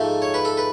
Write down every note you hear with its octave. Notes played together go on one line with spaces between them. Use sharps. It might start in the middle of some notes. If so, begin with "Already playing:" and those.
Already playing: G#2 F3 A3
C#5
B4
A4
B4